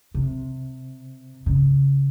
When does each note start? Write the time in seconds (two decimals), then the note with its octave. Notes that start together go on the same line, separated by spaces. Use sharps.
0.14 C3
1.46 C#3